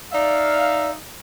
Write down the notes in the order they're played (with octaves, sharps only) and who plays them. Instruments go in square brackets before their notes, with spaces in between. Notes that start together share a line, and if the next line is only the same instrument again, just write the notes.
[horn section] D#4 E5 F5 [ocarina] D5